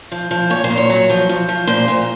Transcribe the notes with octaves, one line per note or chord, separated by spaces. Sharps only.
F3
F3
A#2 C#5
C5
A#2
C#5
F#3
F3
F3
F3
A#2 C5
A#2